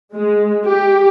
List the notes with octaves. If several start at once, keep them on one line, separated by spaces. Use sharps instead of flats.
G#3
G4